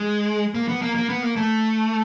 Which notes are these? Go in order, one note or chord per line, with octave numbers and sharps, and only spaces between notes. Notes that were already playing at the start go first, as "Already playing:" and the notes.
Already playing: G#3
A#3
B3
A#3
A#3
B3
A#3
A3